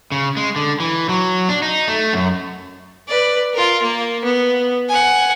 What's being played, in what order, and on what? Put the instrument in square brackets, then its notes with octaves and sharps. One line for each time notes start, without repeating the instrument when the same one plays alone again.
[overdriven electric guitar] C#3
G#3
D3
E3
F#3
D4
D#4
A3
F#2
[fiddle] B4 D5
F4 A#4
A#3
B3
F#5 G#5